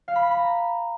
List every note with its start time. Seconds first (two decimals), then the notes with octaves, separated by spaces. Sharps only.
0.08 F5
0.15 B5
0.23 B6
0.31 B5
0.39 A#5